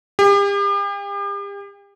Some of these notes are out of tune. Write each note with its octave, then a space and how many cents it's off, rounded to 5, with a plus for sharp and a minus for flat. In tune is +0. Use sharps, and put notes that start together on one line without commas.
G4 +40